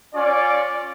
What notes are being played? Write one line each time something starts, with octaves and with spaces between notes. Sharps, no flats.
C#4 F4 D5